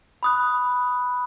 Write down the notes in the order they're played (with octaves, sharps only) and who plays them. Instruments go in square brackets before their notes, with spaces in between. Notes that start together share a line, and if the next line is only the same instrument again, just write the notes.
[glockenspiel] B5 D#6 F#6